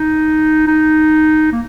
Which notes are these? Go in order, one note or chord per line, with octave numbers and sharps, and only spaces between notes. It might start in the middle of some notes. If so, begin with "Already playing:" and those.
Already playing: D#4
D#4
A#3